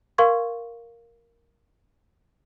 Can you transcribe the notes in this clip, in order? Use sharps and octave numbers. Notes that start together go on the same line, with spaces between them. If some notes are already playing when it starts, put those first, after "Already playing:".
A#4 F5 C6 C#6 G#6